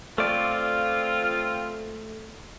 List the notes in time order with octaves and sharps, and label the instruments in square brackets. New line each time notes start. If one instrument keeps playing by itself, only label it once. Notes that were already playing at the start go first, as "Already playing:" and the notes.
[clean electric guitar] A3 D5 [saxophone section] C4 F4